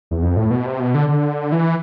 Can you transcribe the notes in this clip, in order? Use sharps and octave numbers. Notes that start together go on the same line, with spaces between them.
E2
F2
A2
B2
C3
B2
D3
D3
E3